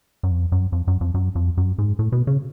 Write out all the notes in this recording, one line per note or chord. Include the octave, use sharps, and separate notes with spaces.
F#2
F2
F#2
F2
F#2
F2
F#2
F2
F#2
G#2
A2
B2
C#3